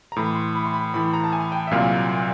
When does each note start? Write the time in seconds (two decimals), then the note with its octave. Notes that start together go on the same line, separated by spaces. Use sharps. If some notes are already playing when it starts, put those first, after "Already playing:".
0.12 A#5
0.16 A2 E3 A3 B5
0.35 C6
0.55 B5
0.66 C6
0.74 B5
0.94 A2 E3 A3 B5
1.13 A#5
1.24 A5
1.33 G#5
1.52 G5
1.67 E5
1.71 C2 A#2 F#3 A#3 F5